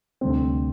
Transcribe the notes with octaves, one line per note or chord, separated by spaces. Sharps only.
D2 C3 G3 C4